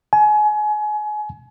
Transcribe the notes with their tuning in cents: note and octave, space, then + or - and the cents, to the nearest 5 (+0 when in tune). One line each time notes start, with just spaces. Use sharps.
G#5 +30